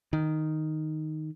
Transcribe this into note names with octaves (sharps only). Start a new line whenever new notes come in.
D#3